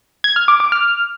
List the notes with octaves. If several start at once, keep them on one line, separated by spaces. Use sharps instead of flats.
G#6
F6
D6
D6
F6